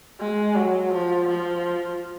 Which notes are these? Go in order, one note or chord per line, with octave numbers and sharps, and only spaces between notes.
G#3
F#3
F3
F3